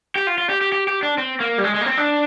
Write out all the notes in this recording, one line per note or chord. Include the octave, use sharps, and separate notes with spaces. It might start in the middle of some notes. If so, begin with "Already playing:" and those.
G4
F4
F4
G4
G4
G4
G4
D4
C4
A#3
G3
G#3
G#3
A#3
C4
D4